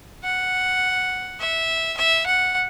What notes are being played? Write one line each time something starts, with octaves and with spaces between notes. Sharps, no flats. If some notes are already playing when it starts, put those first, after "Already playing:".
F#5
E5
E5
F#5